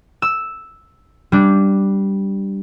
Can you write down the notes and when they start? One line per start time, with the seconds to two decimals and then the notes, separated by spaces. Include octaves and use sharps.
0.22 E6
1.32 G3 D4